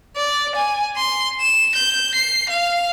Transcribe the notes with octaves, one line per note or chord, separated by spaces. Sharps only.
D5
G#5
C6
E7
G6
C7
F5